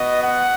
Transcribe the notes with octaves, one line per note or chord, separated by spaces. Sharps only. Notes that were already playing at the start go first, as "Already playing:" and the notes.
Already playing: B3 F#4 D#5
F#5